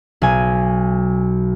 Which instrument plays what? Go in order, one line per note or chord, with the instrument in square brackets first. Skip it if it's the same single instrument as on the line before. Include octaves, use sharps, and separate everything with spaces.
[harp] B1 G#5